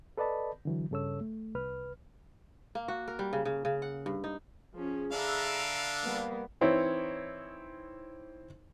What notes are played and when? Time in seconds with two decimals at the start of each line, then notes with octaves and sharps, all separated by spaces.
0.18 A4 B4 D5 D#5 A5 B5
0.65 D3 E3 F#3
0.91 G2 C#3 A4 C#5 E6
1.21 A3
1.55 C2 B4 F6
2.75 A#3
2.88 F#4
3.08 A#4
3.19 G3
3.33 C#3
3.45 C#3
3.65 C#3
3.82 F#5
4.06 G2
4.24 D#4
4.74 F3 C#4 G#4
5.13 D3 D4 E5 F5 A#5 B5
6.02 G3 A#3 B3
6.61 E3 C4 D#4 E4 C#5